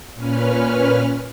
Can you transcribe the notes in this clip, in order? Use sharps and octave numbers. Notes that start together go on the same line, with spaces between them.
A#2 C#4 B4 F6